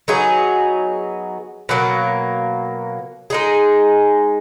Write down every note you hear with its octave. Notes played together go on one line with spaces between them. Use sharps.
F#3 B3 D#4 G#4
B2 F#3 A#3
G#3 D#4 G#4